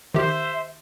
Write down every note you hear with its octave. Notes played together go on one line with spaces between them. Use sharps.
D#3 G4 C5 E5